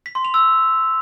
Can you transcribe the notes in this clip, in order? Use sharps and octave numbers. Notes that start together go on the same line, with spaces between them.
B6
C6
F7
E6